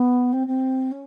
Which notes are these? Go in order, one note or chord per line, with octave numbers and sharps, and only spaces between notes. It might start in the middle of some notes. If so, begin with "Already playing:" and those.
Already playing: B3
C4
C4
C#4